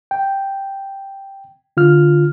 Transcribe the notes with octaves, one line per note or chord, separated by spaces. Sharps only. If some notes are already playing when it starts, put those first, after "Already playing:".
G5
D3 F4 F6